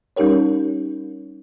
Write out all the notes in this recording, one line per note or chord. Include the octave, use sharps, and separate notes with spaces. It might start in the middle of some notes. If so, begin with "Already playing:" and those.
G3 C#4 D#4 G4 A#4 C#5